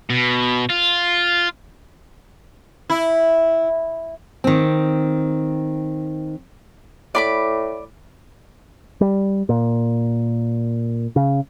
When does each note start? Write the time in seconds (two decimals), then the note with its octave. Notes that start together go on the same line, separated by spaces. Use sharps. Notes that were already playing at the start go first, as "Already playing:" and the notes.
0.10 B2
0.69 F4
2.90 E4
4.44 D#3 C4
7.15 A2 D5 B5 D6
9.01 G3
9.49 A#2
11.16 C#3